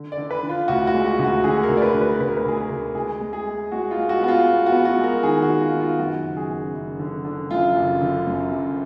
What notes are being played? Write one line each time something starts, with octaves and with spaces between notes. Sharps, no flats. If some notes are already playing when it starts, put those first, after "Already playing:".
Already playing: D3
D5
D3
B4
D3
F4
D2 F#4
F#4
G#3
F#4
D2
F#4
D3 G#4
A#4
D2
D5
B4
D3
B4
D2 B4
A#4
B4
D2 G#4
A#4
D2
G#3 G#4
G#3
G#4
G#3
G#3 F#4
F4
G#3
F#4
B3 F#4
F4
B3
F#4
B3
F#4
G#3
A#4
D#3 G#4
F#4
G#3
F4
D#3
F4
F#2 F#4
F#1
G#4
F#1
F#1
D3
D3
F#2 F4
F#1
D3
F#2
F#1